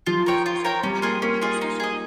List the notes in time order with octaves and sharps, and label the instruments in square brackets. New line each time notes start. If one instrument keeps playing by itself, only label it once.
[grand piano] F3 [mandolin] F4
[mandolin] A#4 C#5 G5
F4
A#4 C#5 G5
[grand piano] G3 [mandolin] C#4
[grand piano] A#3 [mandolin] F4 G#4 D#5
[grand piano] A#3 [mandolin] C#4
[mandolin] F4 G#4 D#5
D#4
G#4 D#5